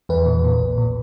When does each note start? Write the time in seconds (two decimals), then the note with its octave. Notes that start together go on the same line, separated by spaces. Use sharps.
0.09 E2 B4
0.26 A#2
0.44 A#2
0.60 A#1
0.78 A#2